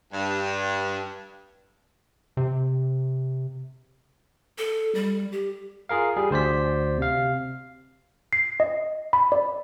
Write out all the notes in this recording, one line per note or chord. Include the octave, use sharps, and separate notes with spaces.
G2
C3
A4
G3
G4
F4 G#4 A#4 F5
G3 G#4
D2 C5 D5 B6
C3 F5
C7
D#5
B5
D5